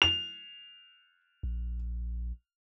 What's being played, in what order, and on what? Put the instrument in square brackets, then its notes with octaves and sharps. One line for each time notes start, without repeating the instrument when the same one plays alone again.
[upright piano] F7
[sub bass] A#1